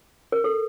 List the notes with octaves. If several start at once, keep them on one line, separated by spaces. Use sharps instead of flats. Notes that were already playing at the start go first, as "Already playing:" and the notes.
A#4
A4